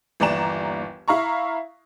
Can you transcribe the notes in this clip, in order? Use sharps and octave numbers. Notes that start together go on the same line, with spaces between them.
G1 D#2 E3 D5 A#5 E7
E4 F5 A#5 C#6